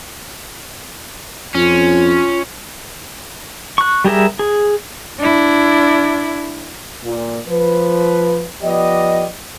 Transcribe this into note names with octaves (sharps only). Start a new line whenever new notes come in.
F2 C#4 F4
C#6 F#6
G3 G4 G#4 A#4 E5
G#4
D4 E4
A#2
F3 B4
F3 B3 G4 D5 D#5